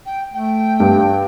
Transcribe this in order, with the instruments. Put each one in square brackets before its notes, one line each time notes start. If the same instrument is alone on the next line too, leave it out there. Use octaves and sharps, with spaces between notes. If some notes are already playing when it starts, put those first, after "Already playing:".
[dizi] G5
[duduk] A3 [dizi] G5
[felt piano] G2